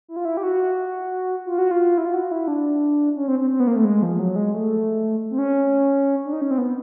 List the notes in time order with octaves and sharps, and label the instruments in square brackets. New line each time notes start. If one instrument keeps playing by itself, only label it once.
[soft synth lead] E4
F4
E4
G4
F#4
F4
F#4
F4
E4
F4
F#4
E4
D4
C#4
C4
C4
C4
B3
A#3
A3
G#3
F3
F#3
G#3
A3
C4
C#4
D4
D#4
C#4
C4
B3